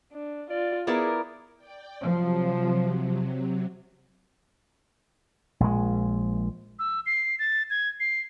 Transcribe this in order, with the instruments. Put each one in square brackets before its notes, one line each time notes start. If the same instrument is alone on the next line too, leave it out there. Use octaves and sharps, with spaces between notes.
[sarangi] D4
[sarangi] F4 [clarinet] D5
[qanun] B3 E4 D5 [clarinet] G#4 [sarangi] A#4
[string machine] D5 G5
[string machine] C3 F#3 [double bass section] F3
[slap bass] A#1 G#3
[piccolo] E6
C7
A6
G#6
C7